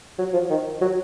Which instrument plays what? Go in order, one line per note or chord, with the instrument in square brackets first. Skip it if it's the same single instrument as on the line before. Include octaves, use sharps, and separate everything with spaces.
[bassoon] F#3
F3
D#3
F#3